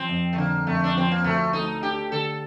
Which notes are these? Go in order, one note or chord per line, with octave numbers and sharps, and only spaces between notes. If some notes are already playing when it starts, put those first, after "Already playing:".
Already playing: F3 C4
F2
A3
D3 A#3
F2 A3
D4
F3 C4
A#3
D2 A3
A3 D#4
D4 G4
D3 A4